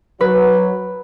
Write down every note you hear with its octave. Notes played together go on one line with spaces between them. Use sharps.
F#3 B4